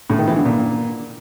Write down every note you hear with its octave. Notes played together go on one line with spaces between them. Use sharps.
A2
D#3
E3
D3
A#2